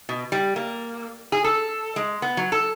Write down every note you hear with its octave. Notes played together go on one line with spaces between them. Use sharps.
B2
G3
A#3
G#4
A4
G#3
B3
F#3
A4